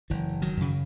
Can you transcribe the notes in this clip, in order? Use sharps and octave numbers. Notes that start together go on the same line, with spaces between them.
F#1 E3
D#3 F#3
F#2 C#3